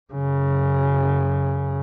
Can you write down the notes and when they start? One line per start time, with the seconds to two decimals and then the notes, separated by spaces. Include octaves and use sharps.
0.12 F#2 C#3